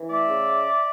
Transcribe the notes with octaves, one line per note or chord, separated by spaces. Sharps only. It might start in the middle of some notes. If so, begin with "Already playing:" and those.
Already playing: E3
A3 D5 E5
C#3